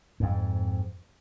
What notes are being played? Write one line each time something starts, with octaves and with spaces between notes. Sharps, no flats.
F2 G#2